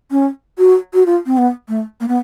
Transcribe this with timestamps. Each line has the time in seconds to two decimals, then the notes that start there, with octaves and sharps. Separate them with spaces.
0.11 C#4
0.58 F#4
0.94 F#4
1.06 F4
1.26 C4
1.37 B3
1.68 A3
2.00 A#3
2.08 B3